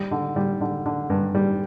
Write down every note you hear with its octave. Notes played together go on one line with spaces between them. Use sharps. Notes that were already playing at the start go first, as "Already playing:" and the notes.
Already playing: G3
D3
G3
D3
D3
G2
G3